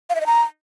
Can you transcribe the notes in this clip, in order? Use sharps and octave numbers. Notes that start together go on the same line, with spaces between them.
F5
E5
D#5
A#5